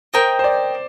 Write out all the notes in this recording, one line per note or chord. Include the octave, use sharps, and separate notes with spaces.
A#4 C5 D#5 G5
C5
D5